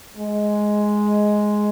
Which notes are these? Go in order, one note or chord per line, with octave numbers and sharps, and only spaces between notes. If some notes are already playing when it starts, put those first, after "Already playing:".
G#3